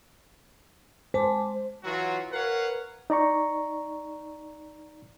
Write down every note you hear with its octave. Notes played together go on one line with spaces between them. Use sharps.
G#3 C5 A5 D6
E3 F#3 F4 F#4
A#4 B4 C#5 F5 F#5
D#4 D5 A#5 C#6